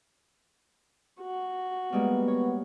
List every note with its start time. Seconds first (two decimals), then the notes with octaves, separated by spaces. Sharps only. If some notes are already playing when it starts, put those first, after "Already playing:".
1.21 F#4
1.92 G3 G#3 A#3 B3
2.28 C#5